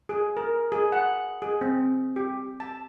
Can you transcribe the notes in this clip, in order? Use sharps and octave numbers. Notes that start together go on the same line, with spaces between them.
G#4
A#4
G#4
F#5
G#4
C4
G4
A5